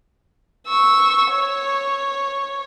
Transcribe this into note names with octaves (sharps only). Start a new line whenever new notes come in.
C#6 E6
C#5